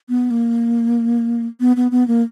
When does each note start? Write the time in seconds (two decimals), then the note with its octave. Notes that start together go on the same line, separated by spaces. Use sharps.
0.09 B3
0.31 A#3
1.60 B3
1.76 B3
1.91 B3
2.08 A#3